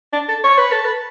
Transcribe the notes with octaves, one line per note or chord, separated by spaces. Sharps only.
D4
A4
C#5
B4
A4
B4